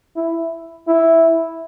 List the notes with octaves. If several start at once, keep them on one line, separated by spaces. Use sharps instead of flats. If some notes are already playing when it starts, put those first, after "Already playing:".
E4
E4